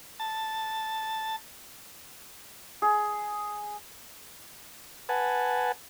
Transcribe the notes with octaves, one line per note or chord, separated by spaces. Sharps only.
A5
G#4
B4 F#5 G#5 A5